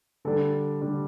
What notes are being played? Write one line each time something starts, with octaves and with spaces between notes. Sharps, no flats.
D3 G3 D4 A4
D3 G3 D4